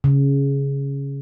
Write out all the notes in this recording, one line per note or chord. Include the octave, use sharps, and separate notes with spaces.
C#3